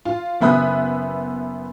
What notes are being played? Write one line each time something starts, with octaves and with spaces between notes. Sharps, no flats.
F4
F#1 B3 E5 B5 D#6 F#6